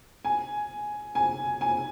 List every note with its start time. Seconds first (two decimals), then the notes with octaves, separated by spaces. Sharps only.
0.25 G#5
1.15 G#5
1.61 G#5